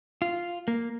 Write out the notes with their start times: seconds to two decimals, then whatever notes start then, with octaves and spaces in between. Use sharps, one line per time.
0.22 F4
0.68 A#3